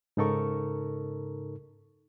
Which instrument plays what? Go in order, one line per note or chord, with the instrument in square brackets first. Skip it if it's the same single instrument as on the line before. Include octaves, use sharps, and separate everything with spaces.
[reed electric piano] G#2 C#3 D#4 A4 A#4 C#6